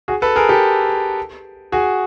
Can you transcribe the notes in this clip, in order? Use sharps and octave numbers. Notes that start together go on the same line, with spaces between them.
F#4 G#4
A4 B4
G#4 A#4
G4 A4
F#4 G#4